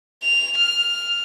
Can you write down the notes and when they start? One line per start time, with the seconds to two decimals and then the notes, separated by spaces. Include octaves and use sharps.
0.23 F7
0.59 F6